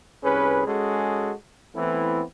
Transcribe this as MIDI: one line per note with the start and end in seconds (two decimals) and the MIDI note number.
0.23 0.63 36
0.23 0.63 61
0.23 0.63 68
0.23 0.63 71
0.66 1.32 56
0.66 1.32 61
0.66 1.32 66
0.66 1.32 68
0.66 1.32 69
1.75 2.22 52
1.75 2.22 57
1.75 2.22 59
1.75 2.22 60
1.75 2.22 64